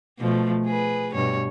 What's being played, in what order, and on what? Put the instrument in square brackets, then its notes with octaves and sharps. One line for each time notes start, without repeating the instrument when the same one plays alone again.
[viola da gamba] B2 F3 A3
G#4 B4
G2 B2 C#5